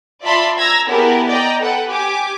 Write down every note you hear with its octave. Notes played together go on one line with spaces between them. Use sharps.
F4 D5 E5 A5 B5 C6
A#5 E6 G#6 A#6
B3 E4 G4 G#4 A#4 A5
D5 D#5 G5 A#5
A4 B4 F#5 G5
G4 G#5 D6